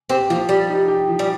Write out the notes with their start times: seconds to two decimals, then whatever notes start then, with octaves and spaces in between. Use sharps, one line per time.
0.09 C4 G4
0.30 F3 A#3
0.49 G3 G4
0.70 D#4
0.88 G4
1.08 F3
1.19 G3